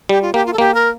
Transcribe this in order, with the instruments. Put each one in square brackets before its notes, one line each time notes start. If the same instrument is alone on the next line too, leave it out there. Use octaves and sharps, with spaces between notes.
[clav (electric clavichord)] G3 [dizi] G4
[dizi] F4
[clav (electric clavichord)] A#3 [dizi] G4
[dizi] F4
A4
[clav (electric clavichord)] A#3 [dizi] G4
[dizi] A#4